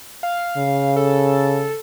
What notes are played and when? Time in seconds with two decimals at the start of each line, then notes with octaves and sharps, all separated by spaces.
0.23 F5
0.57 C#3
0.96 A4